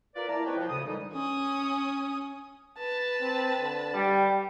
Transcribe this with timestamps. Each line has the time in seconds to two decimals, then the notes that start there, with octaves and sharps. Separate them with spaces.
0.15 F4 A#4 B4 D5
0.28 E3 A#3 E4 D5 A5 A#5
0.46 G#3 C4 E4 B4 C#5 G5
0.57 F3
0.69 D2 A2 C#3 D#6
0.85 A#2 D3 E3 G3 G#3 D#4
1.13 C#4 D#6
2.78 B4 A5
3.21 C4
3.59 D3
3.94 G3 G4